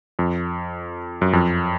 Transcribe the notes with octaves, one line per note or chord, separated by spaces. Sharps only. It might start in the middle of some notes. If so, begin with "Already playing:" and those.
F2
F#2
F2